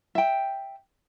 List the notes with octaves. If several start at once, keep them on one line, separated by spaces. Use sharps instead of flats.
E5 G5